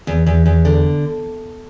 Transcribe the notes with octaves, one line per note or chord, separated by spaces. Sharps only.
E2
E2
E2
D3